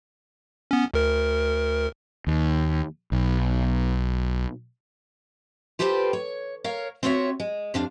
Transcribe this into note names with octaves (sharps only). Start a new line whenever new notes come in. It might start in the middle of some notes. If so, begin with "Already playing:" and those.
B3 C#4
D2 A#4
D#2
B1
F4 G4 A4 B4 C5 G5
C#5
A#4 C#5 F5
C4 F4 F#4 A4 C#5 E5
G#3
F2 C3 D4 F5